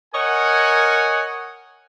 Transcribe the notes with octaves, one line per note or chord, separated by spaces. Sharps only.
A#4 C#5 D#5 F#5 G#5